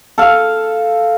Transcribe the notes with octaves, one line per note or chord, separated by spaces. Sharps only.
A4 F5